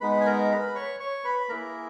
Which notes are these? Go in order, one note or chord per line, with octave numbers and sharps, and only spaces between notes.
G#3 B3 D#4 B4 B5
G#5
A#4 A#5
B4 B5
C#5 C#6
C#5 C#6
B4 B5
A#3 E4 G#4 A#4 A#5